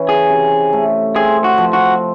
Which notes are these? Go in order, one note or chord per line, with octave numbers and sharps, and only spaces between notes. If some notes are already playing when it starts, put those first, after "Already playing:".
Already playing: E3 C#4
G#4
C3
A3
C4 G#4
F#4
F3
F#4